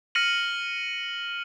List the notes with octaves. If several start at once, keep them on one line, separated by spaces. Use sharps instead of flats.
F6 A#6 C#7 D#7 F#7